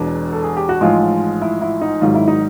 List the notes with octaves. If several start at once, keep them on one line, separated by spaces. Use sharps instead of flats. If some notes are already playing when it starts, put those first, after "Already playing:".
Already playing: E1 E2 B2 D4
A4
G#4
G4
F#4
A1 G#2 F3 G#3 F4
E4
E4
D#4
G#1 G#2 D#3 F#3 F4
E4
D#4